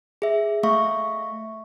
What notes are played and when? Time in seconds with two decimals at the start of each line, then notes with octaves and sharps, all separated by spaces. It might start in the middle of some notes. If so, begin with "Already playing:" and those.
0.22 G#4 E5
0.63 A3 E5 F5 C#6